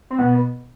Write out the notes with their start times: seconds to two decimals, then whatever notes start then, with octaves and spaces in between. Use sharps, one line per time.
0.10 C4
0.18 B2 B3